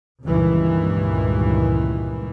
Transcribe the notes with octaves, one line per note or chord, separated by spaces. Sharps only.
C#2 G2 A#2 D#3 E3